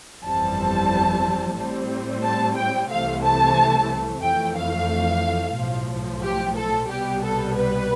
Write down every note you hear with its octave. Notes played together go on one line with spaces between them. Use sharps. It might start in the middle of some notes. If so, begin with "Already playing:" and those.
G1 F2 E3 G3 C4 A5
A2 G3 C4
A5
G5
C2 C3 E3 A3 C4 F5
A5
F2 E3 A3 G5
F5
B1 A2 F3
G4
A4
C2 B2 G3 B3 G4
A4
B4